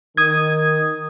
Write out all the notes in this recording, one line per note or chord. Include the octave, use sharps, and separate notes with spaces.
D#3 D#6 G#6